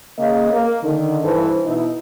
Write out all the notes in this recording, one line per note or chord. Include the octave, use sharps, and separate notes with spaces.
C#3 A#3 D#5
A#3
D3 D#3
G2 E3 A4 C5
B2 D#4 E4